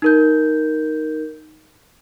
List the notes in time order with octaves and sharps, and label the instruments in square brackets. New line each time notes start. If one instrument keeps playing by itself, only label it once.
[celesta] D#4 A#4 G6